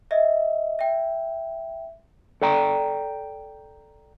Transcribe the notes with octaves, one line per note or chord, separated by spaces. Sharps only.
D#5 E5
E5 G5
A4 D5 G5 A#5